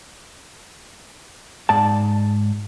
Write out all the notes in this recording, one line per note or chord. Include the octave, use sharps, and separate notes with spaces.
G#2 D5 A5